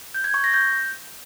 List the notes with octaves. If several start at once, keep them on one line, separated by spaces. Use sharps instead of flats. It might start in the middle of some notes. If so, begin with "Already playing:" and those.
G6
G#6
C#6
A#6
G6